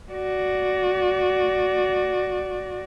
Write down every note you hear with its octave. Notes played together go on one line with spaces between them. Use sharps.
F#4 D5